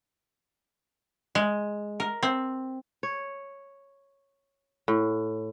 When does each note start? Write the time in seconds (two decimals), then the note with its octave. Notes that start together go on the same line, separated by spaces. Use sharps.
1.35 G#3
2.00 A#4
2.23 C4
3.03 C#5
4.88 A2